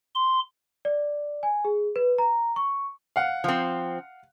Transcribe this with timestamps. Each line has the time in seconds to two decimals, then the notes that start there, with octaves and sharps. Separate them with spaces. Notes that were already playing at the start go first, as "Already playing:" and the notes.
0.15 C6
0.85 D5
1.43 G#5
1.65 G#4
1.96 B4
2.18 A#5
2.56 C#6
3.16 F5 F#5
3.44 F3 C4